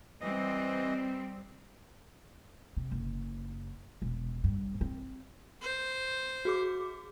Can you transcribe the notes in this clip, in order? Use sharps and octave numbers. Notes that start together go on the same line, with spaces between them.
E3 G3 C4 D#5
C3
F#1
E1
G2
C4
C5
F#4 G#4 D6